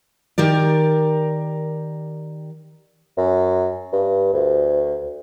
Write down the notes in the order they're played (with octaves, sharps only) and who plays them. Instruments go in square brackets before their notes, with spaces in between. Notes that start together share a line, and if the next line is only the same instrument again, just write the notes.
[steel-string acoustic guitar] D#3 G4 A#4 D5
[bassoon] F#2
G2
D2